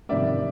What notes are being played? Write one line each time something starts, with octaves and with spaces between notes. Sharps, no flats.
F2 C3 D#3 G3 D5 E5